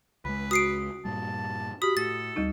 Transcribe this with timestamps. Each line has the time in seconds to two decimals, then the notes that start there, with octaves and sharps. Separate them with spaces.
0.25 C#2 G#3 B4 B5
0.51 F#4 D#6 C7 D7
1.05 G2 A#2 G3 A5
1.82 F#4 G4 B5 D#6
1.97 A2 A4 A6
2.36 D2 G3 D#4